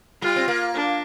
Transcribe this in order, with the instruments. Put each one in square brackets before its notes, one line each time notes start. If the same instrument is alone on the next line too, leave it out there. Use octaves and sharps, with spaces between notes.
[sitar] G3 [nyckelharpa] F4
[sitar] C4
A#3
[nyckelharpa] D4